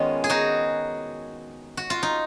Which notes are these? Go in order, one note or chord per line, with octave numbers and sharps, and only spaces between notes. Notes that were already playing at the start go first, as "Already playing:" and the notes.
Already playing: D#3 G#3 B3 C#4 F4
G#4
D#4 F#4
F#4
F4
D#4